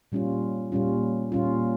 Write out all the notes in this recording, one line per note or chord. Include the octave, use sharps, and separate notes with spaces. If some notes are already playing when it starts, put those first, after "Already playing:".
A#2 G3 C#4 F4
A#2 G3 C#4 F4
A#2 G3 C#4 F4